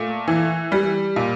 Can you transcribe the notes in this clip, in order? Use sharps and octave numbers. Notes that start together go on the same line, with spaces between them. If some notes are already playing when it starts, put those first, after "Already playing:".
Already playing: A#2 A3
E3
G3
A#2